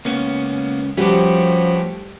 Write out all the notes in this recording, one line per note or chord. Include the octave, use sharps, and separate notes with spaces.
C#2 A#3 B3 C#4
F3 G3 A3 C#4 F#4 G4 B4